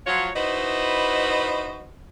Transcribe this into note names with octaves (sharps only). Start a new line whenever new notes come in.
F3 F#3 F4 F#4 C#5
D#4 E4 F#4 B4 C5 D#5